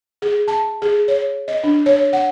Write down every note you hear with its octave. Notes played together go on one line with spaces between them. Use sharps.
G#4
A5
G#4
C#5
D#5
D4
C#5
F#5